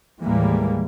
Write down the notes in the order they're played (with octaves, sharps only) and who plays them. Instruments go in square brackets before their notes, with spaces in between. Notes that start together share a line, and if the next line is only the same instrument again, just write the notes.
[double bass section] D#2 A2 E3 G3 G#3 A#3